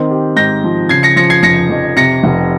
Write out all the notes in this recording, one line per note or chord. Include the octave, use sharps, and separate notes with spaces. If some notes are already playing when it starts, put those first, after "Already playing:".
Already playing: D#3 C4
G4
G#2 G6 A#6
F3
C#3 G#6 C7
A#6 C#7
F3 A#6 C#7
G#6 C7
F1 A#6 C#7
F2
C3 A#6 C#7
F1